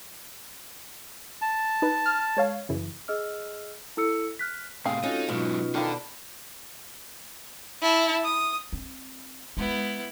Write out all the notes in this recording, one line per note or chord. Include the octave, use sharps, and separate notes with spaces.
A5
D#4 B4
F6
G#3 C#5 F5
F#2 C#3 E3
G#4 D#5 E6 F6
E4 A4 E6 C#7
F6 F#6 B6
A2 C3 C4 G#4 F5
C#4 D#4 F4 F#4 A4
G#2 B2 F#3 C#4 D#4 F4
D#3 F4 A4 D5 A5 B5
E4 A5
D#6
C4
G#3 B3 E4